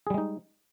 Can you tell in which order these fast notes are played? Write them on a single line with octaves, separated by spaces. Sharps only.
G#4 G3 G#3 D#4